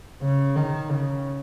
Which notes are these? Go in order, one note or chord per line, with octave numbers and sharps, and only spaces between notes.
C#3
D#3
C#3